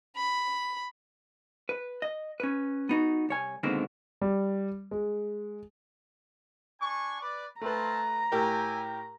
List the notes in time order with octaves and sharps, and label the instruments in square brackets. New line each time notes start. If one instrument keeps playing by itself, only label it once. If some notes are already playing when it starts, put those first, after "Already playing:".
[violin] B5
[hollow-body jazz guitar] B4
D#5
C#4 B4
B3 D#4 F#4
C2 C#5 G#5
B2 D3 D#3 G#3 A#3 C4
[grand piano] G3
G#3
[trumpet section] D4 G#5 C#6
B4 D5
[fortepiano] A3 B4 [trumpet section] C4 F4 A5 [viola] A#5
[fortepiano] A2 G4 A#4 [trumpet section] E5 G5 G#5